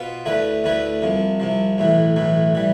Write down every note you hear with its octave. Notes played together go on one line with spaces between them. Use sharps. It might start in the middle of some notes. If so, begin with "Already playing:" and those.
Already playing: B2 B3 F4 C5
D2 D3 A3 E4 B4
D2 D3 A3 E4 B4
C2 C3 F3
C2 C3 F3
B1 A2 E3
B1 A2 E3
E3 G3